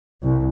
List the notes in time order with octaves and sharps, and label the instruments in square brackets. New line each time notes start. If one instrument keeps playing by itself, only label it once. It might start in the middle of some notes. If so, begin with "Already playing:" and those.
[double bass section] C2